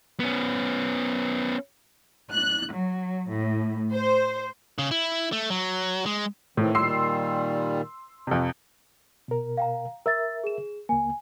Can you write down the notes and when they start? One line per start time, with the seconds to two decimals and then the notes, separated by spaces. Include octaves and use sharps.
0.20 B3 C#4
2.31 F#6
2.74 F#3
3.29 A2
3.94 C5
4.79 C#3
4.91 E4
5.32 A3
5.50 F#3
6.06 G#3
6.57 A2 D#3 E3 C4
6.75 A#2 D#3 G3 C6 E6 C7
8.27 F2 C3
9.28 B2 A#4
9.57 F5 G5 A#5
10.06 A#4 E5 E6 A6
10.44 G#4 E7
10.89 C#2 A#3 G#5